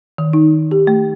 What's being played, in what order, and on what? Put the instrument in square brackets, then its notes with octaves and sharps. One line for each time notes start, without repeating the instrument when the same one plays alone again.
[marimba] D#3
D#4
G4
A3